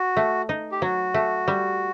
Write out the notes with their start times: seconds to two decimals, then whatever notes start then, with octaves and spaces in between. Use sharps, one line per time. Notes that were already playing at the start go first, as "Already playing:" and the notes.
Already playing: F#4
0.17 A3
0.49 D#4
0.72 G4
0.82 F#3 F#4
1.14 A3
1.48 G3